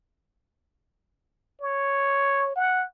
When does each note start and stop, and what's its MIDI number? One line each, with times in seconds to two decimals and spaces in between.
1.61 2.54 73
2.56 2.85 78